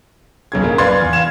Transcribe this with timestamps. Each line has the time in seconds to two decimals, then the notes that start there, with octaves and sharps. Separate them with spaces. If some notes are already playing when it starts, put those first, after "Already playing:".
0.52 B1 C#3 G#6
0.63 F#2 C#3 A#3
0.78 B4 D5 F5 C6 G#6 A6
1.01 E2
1.13 F5 G#6 E7